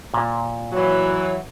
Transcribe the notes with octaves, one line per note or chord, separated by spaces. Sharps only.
A#2
E3 F#3